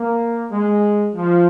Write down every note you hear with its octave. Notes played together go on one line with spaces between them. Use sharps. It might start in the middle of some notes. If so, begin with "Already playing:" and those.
Already playing: A#3
G#3
F3